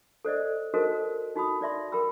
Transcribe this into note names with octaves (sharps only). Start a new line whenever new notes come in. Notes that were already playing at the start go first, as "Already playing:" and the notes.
A4 C5 D5 D#5
D#4 F#4 A4 A#4 C5 D#5
D#4 F#4 B5 D#6
D#4 D5 E5 C6
A#4 G5 B5 E6